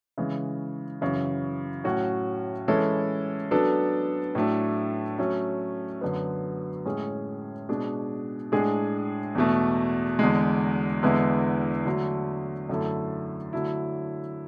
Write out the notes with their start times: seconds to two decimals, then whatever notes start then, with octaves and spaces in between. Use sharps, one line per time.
0.18 C#3 E3 G#3
1.01 F#2 C#3 E3
1.84 A2 F#3 C#4 F#4
2.68 E3 G#3 C#4 E4 A4
3.51 F#3 B3 D4 A4
4.35 A2 F#3 A3 D4
5.18 F#3 A3 C#4
6.01 F#2 D3 F#3 B3
6.85 A2 G#3 C#4 G#4
7.69 B2 G#3 D4 G#4
8.52 A2 G#3 D4 G#4
9.35 E2 B2 A3
10.19 E2 D3 G#3
11.03 E2 D3 G#3 B3 E4
11.86 D3 F#3 A3
12.69 F#2 D3 A3 E4 A4
13.53 D3 F#3 A3 E4